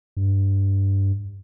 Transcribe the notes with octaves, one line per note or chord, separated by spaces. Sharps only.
G2